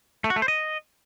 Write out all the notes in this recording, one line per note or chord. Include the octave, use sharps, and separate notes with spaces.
A3
F#4
A3
C5
D#5